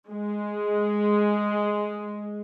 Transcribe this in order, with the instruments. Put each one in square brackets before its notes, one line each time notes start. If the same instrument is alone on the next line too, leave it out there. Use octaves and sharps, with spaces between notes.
[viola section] G#3